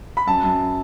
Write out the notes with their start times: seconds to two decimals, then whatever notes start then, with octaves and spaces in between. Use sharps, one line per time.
0.17 B5
0.27 F#2 A5
0.43 F#2